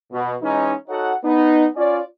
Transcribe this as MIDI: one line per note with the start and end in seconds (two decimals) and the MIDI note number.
0.12 0.33 47
0.42 0.73 52
0.42 0.73 56
0.42 0.73 61
0.42 0.73 63
0.88 1.12 63
0.88 1.12 66
0.88 1.12 69
0.88 1.12 73
0.88 1.12 78
1.25 1.67 59
1.25 1.67 63
1.76 2.00 61
1.76 2.00 65
1.76 2.00 74